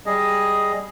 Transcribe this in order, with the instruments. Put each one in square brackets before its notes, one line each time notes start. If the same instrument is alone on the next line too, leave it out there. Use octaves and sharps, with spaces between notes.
[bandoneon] G3 G#4 D#5